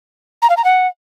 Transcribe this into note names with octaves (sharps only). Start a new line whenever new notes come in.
A#5
F5
A#5
F#5